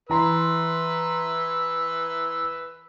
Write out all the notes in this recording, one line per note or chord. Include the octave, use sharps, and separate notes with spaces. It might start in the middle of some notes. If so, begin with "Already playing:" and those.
E3 B4 A#5 C6 E6